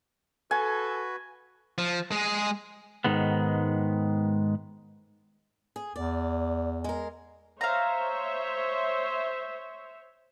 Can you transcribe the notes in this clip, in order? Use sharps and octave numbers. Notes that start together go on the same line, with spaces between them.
F#4 A4 B4 G#5
F3
G#3 G#4
G#2 D#3 G#3 B3
G#4
E2 D5
G#3 A#4
C5 C#5 E5 F5 A#5